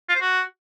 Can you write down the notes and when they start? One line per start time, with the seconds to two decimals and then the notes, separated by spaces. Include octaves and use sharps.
0.09 F4
0.15 C5
0.21 F#4